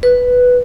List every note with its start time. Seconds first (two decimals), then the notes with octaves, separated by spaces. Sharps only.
0.03 B4